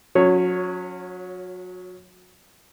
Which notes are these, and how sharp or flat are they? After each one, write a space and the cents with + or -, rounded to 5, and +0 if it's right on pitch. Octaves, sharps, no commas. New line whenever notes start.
F#3 -30 C#4 +5 C#5 +0